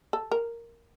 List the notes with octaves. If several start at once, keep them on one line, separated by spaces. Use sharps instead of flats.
A4
A#4